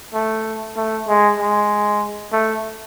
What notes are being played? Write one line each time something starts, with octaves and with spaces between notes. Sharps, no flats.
A3
A3
G#3
G#3
A3